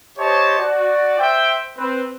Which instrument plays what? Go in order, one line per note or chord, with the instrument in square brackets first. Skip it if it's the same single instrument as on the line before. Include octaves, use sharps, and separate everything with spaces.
[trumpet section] G4 C5 C#5 D#5 A5
F#4 D5
C5 E5 G5
C4 B4